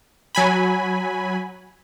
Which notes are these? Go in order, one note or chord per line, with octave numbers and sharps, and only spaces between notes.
F#3 G#5 B5